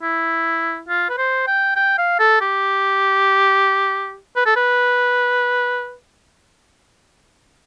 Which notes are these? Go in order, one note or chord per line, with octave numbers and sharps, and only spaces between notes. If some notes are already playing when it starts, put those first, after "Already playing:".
E4
F4
B4
C5
G5
G5
F5
A4
G4
B4
A4
B4